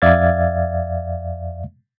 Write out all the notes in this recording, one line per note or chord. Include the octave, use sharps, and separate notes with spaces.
F2 D5 E5 F5 G#6 A6